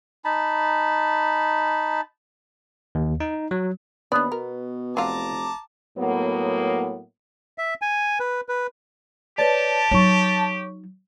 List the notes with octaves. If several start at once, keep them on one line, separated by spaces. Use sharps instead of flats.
D#4 A5 B5
D#2
D#4
F#3
D#2 B3 D4 D5
B2 A#4
F1 F#3 F4 A5 A#5 D6
A2 F#3 A#3 B3
E5
G#5
B4
B4
G4 B4 C#5 D5 A5
F#3 D#4 C#5 C#6